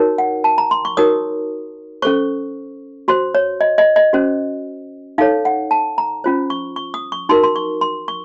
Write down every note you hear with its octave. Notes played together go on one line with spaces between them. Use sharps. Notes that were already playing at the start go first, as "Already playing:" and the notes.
Already playing: D#4 F#4 A#4 C#5
F#5
A5
A#5
C6
C#6
D#4 F#4 A#4 C#5 D#6
C#4 A4 C5 C#6
F#4 C5 C6
C#5
D#5
D#5
D#5
C#4 F#4 C5
D#4 A4 C#5 F5
F#5
A5
A#5
C#4 F4 C5
C#6
C#6
D#6
C#6
D#4 F#4 A#4 C6
C6
C#6
C6
C#6